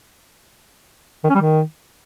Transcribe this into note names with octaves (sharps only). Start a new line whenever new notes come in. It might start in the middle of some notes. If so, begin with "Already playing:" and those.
D#3
C#4
G3
D#3